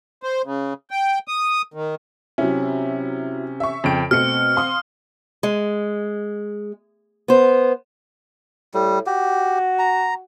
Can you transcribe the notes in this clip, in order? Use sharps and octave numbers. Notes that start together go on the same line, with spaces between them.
C5
C#3
G5
D#6
D#3
C3 F#3 C#4 E4
E5 C#6
F2 C#3 G5 D7
B2 A3 C4 F6 C#7
F5 C6 D#6
G#3
B3 C5
A2 G3
F#4 G4
A#5